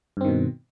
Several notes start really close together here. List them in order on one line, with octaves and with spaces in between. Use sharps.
G2 C4 D#3 B2